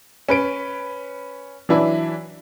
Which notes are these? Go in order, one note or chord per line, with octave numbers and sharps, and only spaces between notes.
C#4 B4 D7
E3 F#3 D4 E4 B4